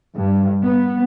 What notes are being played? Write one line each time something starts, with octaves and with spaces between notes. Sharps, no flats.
G2
B3